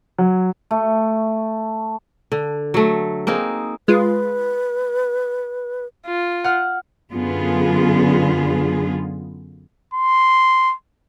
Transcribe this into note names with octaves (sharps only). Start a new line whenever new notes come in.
F#3
A3
D3
F#3 A3
A#3 C4 D#4 G#4
G#3 F4 B4
F4
F#5 F6
F#2 D3 B3 F4 G#4
C6